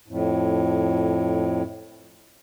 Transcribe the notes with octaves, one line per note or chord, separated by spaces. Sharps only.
F2 A2